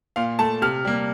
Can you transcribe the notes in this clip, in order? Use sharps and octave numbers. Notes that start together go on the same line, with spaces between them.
A#2 F5
A3 A5
C3 F6
G3 A#3